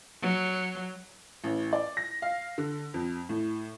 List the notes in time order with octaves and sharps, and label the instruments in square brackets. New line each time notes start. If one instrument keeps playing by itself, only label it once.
[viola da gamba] F#3
[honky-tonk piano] A1
D5
A#6
F5
D3
F2
A2